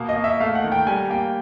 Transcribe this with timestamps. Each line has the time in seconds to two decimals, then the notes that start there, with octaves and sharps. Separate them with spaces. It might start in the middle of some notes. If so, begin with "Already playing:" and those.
Already playing: B2 A#3
0.09 D#5
0.16 A#3
0.24 E5
0.40 A3 F5
0.55 F#5
0.64 D#3
0.72 G5
0.87 G3 G#5
1.10 A#3 G5